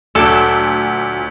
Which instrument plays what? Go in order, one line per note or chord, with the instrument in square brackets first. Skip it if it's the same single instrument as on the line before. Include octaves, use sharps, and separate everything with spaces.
[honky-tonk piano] D2 [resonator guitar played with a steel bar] A#2 F#3 [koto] A4 [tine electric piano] D6 E6